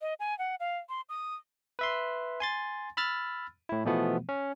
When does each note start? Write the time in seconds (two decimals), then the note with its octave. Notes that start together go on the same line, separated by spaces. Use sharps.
0.01 D#5
0.20 G#5
0.39 F#5
0.60 F5
0.89 C6
1.09 D#6
1.79 B4 E5 C6
2.40 G#5 C6 A6
2.97 B5 E6 F6 A6
3.69 A2 E4
3.85 B2 E3 F3 A3 B3
4.29 C#4